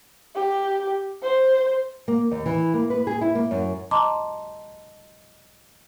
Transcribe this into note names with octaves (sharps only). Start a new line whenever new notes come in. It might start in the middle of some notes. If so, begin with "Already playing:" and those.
G4
C5
A#3
D#2
E3
A#3
B4
G#4
E4
A#3
F#2
D#5 A5 A#5 C6 D6